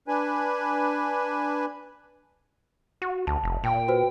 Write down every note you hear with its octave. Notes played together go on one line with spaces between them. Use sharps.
D4 B4 G#5
F#4
D2 A5
F1
A#2 G5
F#4 B4 C5